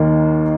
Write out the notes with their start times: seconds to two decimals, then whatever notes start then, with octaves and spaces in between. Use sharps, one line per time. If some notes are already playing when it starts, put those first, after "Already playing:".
Already playing: D#2 D#3 A#3